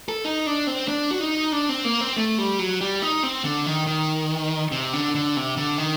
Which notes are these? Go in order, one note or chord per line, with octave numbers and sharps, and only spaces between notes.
A4
D#4
D4
C4
D4
F#4
D#4
D4
C4
A#3
C4
A3
G3
F#3
G3
D#4
C4
D3
D#3
D#3
C3
D3
D3
C3
D3
D#3